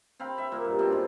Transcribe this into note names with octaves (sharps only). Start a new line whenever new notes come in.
C4 F5 G5 B5
E5
A#2 A#3
G2
B2 F3 C4 D4
G#2 D4